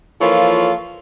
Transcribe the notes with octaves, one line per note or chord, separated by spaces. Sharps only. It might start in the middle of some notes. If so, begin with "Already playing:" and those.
E3 F3 A#3 F4 A4 C#5